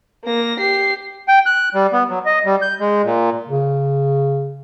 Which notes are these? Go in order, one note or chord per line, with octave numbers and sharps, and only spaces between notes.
A#3 A#6
G4 C7
G5
F#6
G3
B3
F#3
D#5
G3
G6
G#3
A#2
C#3